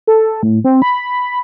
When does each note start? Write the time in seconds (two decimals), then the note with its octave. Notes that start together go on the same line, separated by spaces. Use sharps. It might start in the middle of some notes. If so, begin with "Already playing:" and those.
0.07 A4
0.43 A2
0.64 C4
0.82 B5